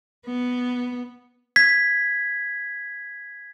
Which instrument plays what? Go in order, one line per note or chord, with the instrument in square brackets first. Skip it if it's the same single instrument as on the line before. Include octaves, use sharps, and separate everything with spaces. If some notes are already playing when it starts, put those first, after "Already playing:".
[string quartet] B3
[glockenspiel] G#6 B6